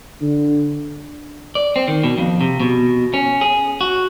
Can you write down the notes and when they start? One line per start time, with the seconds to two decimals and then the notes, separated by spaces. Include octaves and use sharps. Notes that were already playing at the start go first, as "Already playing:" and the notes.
0.22 D3
1.55 D5
1.76 C4
1.88 D#3
2.04 B2
2.18 F2
2.41 C3
2.60 B2
3.14 C#4
3.41 G#4
3.81 F#4